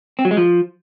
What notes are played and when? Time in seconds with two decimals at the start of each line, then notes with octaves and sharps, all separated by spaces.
0.19 C4
0.25 F#3
0.31 G#3
0.37 F3